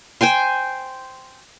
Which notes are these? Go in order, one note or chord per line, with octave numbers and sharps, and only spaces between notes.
C5 G5 G#5 C6